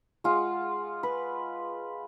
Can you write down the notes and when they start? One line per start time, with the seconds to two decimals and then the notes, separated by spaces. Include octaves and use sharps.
0.24 G#3 F4 F#5
1.03 B4